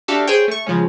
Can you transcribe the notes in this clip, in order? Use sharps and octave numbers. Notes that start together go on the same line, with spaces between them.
D4 F#4 G4 A4 E5 F5
G#4 C5 C#5 G5
A3 C#6
C#3 F3 G#3 C#4